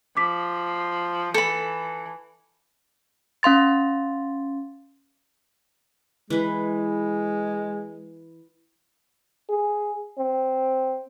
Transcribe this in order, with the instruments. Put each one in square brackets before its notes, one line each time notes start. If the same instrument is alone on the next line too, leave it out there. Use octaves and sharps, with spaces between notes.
[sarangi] F3 [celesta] D6 B6
[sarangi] E3 [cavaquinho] A4 B5
[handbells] C#4 F5 C6 A6
[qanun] E3 B4 [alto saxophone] G#3
[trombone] G#4
C4